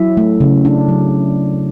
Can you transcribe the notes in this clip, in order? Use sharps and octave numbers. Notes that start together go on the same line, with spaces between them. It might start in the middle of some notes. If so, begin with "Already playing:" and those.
Already playing: F#3 E4 E5
A3
C#3
D4
F#3